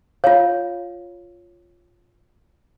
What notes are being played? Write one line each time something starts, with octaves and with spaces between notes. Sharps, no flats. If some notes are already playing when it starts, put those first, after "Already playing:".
F4 C#5 F5